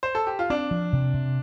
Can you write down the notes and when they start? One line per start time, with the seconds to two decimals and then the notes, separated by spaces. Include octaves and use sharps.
0.03 C5
0.15 A4
0.27 G4
0.39 F4
0.50 C4 D4
0.71 F3
0.93 C3
1.14 C3